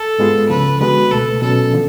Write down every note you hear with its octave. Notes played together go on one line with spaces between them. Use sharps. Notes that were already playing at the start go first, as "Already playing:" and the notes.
Already playing: A4
G#2 G#3 B3 F4 G#4
C#2 C#3 F3 B4
D3 G#3 B3 F#4 B4
C#2 B2 A3 A4
B2 F#3 C#4 A4
D3 F3